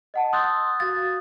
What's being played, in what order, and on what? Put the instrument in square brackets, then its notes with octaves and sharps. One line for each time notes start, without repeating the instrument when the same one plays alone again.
[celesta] D#5 F#5 A5
[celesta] C6 E6 A6 [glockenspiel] D#6 F#6 G6
[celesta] F#4 F5 [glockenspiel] A6